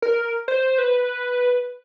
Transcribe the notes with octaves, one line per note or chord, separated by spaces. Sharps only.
A#4
C5
B4